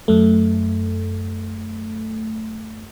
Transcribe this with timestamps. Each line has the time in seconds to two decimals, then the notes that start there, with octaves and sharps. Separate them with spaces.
0.08 F#2 A3